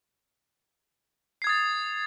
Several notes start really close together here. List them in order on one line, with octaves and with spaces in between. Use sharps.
C7 G#6 D#6 A6